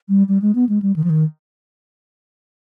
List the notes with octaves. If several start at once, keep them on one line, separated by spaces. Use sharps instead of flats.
G3
G3
G#3
B3
G#3
G3
D#3
F3
D#3